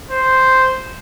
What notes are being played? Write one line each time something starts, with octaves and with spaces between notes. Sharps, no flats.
C5